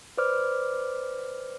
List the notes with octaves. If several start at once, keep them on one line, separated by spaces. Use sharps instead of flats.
B4 C5 D5 D6 F6